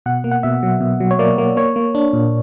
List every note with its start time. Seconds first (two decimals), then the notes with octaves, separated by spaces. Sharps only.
0.06 B2 F#5
0.24 A#3
0.31 F#5
0.43 B2 E5
0.63 F#3
0.81 B2
1.00 F#3
1.11 C#5
1.19 A#3 D5
1.38 A#3
1.57 A#3 C#5
1.76 A#3
1.95 D4
2.13 A#2